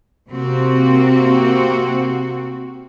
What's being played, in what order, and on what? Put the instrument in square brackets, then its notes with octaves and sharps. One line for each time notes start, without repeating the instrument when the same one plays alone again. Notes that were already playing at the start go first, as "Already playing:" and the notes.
[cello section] C3 A#3 C4 F#4